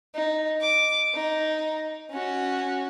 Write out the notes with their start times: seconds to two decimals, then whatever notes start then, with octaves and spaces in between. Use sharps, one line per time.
0.15 D#4
0.61 D6
1.14 D#4
2.11 C#4 F#4